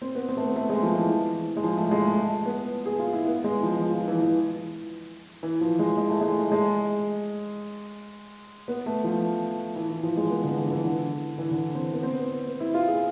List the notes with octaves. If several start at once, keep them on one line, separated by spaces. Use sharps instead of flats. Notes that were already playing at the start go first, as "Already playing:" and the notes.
C4
B3
C4
A3
B3
A3
G#3
F3
E3
G#3
F3
A3
G#3
A3
B3
G#4
F4
E4
B3
G#3
F3
F3
F3
E3
E3
E3
F3
G#3
G#3
A3
G#3
G#3
B3
A3
F3
E3
E3
F3
G#3
B3
D3
E3
F3
E3
D3
E3
D3
E3
C4
B3
C4
B3
B3
E4
F4
G#4